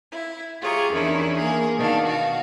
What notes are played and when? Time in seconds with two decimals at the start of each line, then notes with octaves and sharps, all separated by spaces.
0.11 E4
0.60 F4 G4 G#4 C#5 A#5
0.93 E2 D#3 C#4 D4 E4
1.36 A#3 G#4
1.78 B2 D#3 D4 F5
2.07 F#4 F5